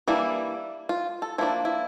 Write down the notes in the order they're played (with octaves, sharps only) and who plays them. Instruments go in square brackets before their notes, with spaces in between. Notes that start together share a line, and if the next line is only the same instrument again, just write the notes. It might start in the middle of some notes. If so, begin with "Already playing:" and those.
[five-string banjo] E3 G3 A#3 D4 E4
F4
A4
F3 A#3 D4 E4
E4